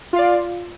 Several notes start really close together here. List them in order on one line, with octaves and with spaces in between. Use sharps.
F4 F5 D5